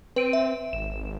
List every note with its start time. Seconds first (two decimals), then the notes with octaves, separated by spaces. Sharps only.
0.16 C4 B4 D7 D#7
0.33 E5
0.73 G#1 E7